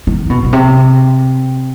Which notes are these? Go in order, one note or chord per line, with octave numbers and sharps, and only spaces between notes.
D#3
B2
B2
C3